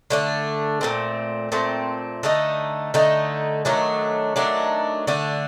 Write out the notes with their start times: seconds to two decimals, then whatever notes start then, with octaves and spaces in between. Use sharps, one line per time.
0.10 D3 A3 D4
0.81 A#2 A3 C4
1.52 A#2 A3 C4
2.23 D3 A3 D#4
2.94 D3 A3 D#4
3.65 D#3 F#3 A3 D4
4.36 D#3 F#3 A3 D4
5.07 D3 A3 D4